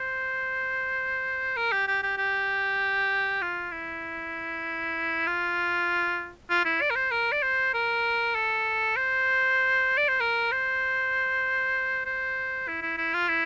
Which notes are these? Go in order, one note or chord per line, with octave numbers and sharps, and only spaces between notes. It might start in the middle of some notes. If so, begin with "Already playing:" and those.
Already playing: C5
A#4
G4
G4
G4
G4
F4
E4
F4
F4
E4
D5
A#4
C5
A#4
D5
C5
A#4
A4
C5
D5
C5
A#4
C5
C5
E4
E4
E4
F4
E4